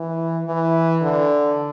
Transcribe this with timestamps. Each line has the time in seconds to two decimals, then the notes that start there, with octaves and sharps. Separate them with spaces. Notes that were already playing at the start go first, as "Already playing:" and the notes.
Already playing: E3
0.46 E3
1.02 D3